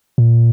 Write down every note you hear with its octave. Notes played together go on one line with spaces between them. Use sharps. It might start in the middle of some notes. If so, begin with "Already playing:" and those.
A#2